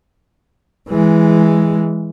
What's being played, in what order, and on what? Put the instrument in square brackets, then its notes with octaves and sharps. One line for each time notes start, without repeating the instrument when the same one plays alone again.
[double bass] E3 G#3